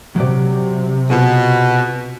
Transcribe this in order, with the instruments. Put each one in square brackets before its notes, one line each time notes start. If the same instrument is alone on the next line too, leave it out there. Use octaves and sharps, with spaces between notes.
[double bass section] C3 [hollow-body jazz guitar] F#3 G4 D5
[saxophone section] B2 [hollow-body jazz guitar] F4 F#4 G#4